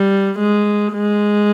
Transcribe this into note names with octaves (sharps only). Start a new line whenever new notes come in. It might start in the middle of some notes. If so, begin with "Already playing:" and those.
Already playing: G3
G#3
G#3